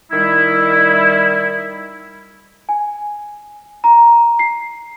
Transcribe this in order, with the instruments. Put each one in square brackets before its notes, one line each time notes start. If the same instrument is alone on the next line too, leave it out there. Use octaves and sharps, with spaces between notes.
[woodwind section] D#3 G3 E4
[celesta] G#5
A#5
C7